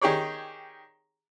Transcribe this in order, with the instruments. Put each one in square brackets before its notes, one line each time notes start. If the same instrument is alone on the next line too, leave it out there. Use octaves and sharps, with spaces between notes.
[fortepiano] D#3 G4 G#4 C#5 D5